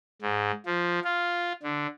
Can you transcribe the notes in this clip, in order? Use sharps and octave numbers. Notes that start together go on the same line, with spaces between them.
G#2
F3
F4
D3